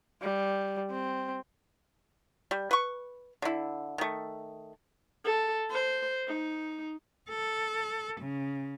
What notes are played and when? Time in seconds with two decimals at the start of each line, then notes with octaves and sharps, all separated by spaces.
0.22 G3
0.91 C4
2.51 G3
2.71 B4 C#6
3.42 D3 E4
3.98 D#3 A3
5.25 A4
5.70 C5
6.27 D#4
7.29 A4
8.20 C#3